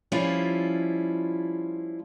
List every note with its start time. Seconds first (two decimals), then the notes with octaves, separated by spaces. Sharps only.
0.12 F3 G3 C#4 E4 F4